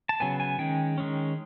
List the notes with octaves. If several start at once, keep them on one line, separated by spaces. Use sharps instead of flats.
A5
C#3 F#3 B3 G#5
G#5
D#3 G#3 C#4 G5
D#3 G#3 C#4